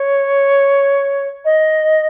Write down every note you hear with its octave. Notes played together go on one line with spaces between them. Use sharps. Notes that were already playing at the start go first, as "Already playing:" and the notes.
Already playing: C#5
D#5